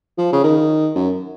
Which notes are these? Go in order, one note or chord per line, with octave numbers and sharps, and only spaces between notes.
F3
C#3
D#3
F#2